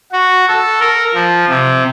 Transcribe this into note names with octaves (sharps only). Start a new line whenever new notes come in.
F#4
A4
A#4
F3
C3